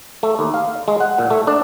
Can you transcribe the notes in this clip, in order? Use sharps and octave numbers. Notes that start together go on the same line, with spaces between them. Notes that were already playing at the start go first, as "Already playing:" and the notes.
A3
D#2
F5
G#3
F#5
A#2
A3
D4